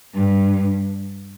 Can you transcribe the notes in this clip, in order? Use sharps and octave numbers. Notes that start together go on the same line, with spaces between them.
G2